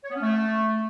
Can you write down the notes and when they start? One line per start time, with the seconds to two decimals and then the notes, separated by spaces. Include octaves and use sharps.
0.04 C#5
0.10 B3
0.15 C#4
0.21 A3